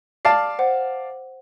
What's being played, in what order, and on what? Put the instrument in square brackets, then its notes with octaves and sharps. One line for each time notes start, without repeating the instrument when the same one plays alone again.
[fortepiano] D5 F5 A5 [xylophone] C7
[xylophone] C5 F#5